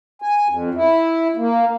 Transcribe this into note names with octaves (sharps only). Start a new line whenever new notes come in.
G#5
F2
E4
A#3